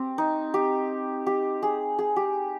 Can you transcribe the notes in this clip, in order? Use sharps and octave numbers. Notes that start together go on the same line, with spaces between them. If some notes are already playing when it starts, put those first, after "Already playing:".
Already playing: C4 G4
D#4
G4
G4
G#4
G#4
G4